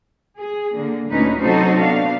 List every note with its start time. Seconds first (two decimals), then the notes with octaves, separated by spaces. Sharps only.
0.38 G#4
0.75 D3 A#3
1.11 D2 A#2 A#3 C#4 D#4 B4
1.39 C3 F#3 D#4 F#4 A4 C5
1.80 B3 D4 F5